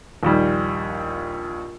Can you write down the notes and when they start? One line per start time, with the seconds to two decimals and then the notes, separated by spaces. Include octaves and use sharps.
0.23 A#1 D#2 G3